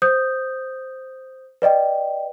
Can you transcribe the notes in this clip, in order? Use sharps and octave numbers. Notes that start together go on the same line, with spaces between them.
C5 D#6 G6
B4 D5 D#5 G5